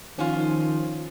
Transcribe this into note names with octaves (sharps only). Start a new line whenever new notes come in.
D#3 F3 C#4 F4